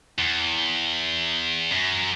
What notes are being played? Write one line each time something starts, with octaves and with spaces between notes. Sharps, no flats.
E2
F#2